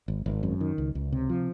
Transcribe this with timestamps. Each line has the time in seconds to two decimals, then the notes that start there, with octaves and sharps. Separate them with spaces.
0.08 G#1
0.26 G#1
0.43 F#2
0.61 D#3
0.78 C#2
0.95 C#2
1.12 C3
1.29 F3